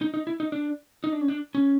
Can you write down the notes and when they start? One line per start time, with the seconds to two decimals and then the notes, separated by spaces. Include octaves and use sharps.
0.01 D#4
0.14 D#4
0.27 E4
0.40 D#4
0.52 D4
1.04 D#4
1.12 D4
1.21 C#4
1.28 D4
1.55 C#4